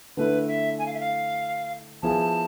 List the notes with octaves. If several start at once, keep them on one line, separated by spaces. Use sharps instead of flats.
D3 A3 E4 B4
E5
G#5
F5
E5
F5
F3 B3 E4 G#4 A5